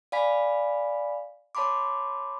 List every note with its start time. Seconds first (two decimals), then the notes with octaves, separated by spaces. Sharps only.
0.12 D5 F5 G#5 B5 B6
1.55 C#5 A5 B5 C6 D6